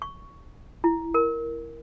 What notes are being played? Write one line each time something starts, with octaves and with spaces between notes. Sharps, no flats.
C#6
E4
A#4